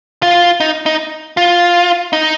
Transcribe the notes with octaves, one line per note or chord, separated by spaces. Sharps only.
F4
D#4
D#4
F4
D#4